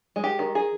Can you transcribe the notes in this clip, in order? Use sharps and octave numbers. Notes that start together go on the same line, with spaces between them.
G#3
G4
D#3
G#4